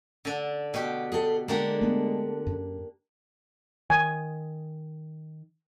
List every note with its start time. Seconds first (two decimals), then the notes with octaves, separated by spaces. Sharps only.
0.25 D3 D4
0.74 B2 G4
1.12 G#4 A4
1.48 D3 G#3 A#3 D4 G4 F#5
1.81 A3 B3
2.47 F#2
3.90 D#3 G#5